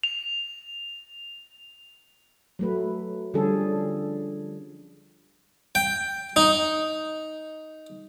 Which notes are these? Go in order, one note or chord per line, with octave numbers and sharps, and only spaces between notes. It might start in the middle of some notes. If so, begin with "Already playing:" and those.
F7
F#3 A3 B4
D3 F3 G3 C#4 G#4 A4
G5
D#4